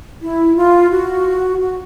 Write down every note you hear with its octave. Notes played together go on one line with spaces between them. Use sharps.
E4
F4
F#4
F#4